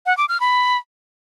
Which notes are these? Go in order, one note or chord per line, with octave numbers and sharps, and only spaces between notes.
F#5
D6
F6
B5